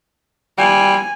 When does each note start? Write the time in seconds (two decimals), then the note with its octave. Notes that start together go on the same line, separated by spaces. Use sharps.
0.58 G3 G#5